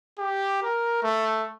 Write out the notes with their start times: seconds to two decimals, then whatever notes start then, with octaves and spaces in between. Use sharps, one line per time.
0.19 G4
0.63 A#4
1.03 A3